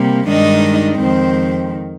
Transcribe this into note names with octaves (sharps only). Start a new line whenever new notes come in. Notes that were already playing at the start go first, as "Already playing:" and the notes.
Already playing: C3 G3 A#3
G2 D#3 G#3 D4 D#4 D#5
F2 D#3 G#3 C4 C5